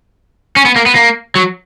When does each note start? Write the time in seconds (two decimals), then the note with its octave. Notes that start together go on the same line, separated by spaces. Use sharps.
0.56 C#4
0.65 B3
0.76 A#3
0.86 B3
0.96 A#3
1.36 F#3